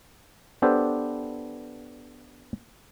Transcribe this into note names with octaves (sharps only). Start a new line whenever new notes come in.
B3 D4 G4 A4 B4 C5